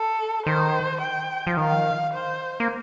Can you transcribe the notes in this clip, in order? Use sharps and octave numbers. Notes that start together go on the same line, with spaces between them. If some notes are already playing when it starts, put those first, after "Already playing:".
Already playing: A4
D#3 C5
G5
F3
D#3 F5
C5
A#3